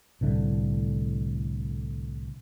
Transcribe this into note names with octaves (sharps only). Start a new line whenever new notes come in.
C2 A2 D3 A3